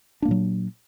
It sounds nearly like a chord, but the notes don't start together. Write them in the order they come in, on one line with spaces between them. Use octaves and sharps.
D4 A#3 A#2 F#3